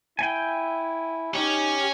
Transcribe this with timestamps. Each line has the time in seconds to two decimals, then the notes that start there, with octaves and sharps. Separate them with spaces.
0.19 E4 G5 G#5
1.34 C#4 D#4 G4